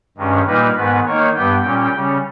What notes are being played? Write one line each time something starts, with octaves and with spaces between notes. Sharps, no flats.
G2 D#3 G#3 C#4
A#2 G3 A#3 D#4 B4
G#2 D#3 G#3 B3 B4
D#3 A#3 D#4 C#5
G2 G3 B3 G5
A#2 G3 C#4
C#3 G3 C#4